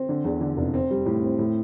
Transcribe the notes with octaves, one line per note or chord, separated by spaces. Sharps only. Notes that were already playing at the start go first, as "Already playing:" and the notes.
Already playing: C4
D3
E2
D3
F1
C4
G3
A2
C4
A2